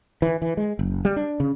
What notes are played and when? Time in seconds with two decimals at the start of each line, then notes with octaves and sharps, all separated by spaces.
0.22 E3
0.42 E3
0.57 G#3
0.79 F#1
1.05 G3
1.16 D4
1.40 C#3